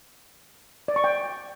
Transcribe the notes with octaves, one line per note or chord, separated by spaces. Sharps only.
D5
C#6
G5